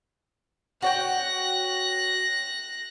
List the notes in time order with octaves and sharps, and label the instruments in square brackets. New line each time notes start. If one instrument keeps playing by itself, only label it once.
[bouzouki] F#4 C#5 G5 [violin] F#6 A#6